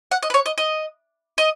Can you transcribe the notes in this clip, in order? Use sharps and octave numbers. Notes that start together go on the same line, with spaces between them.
F#5
D#5
B4
C#5
D#5
D#5
D#5